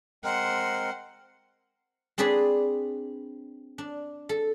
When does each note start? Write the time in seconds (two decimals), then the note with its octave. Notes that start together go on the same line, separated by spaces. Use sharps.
0.24 G#3 C4 A#4 C5 F#5
2.18 C4 D4 G#4 B4 D5
3.78 D4
4.29 A4